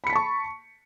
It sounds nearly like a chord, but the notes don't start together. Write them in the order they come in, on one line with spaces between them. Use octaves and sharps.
B5 C#7 B6 A5 C#6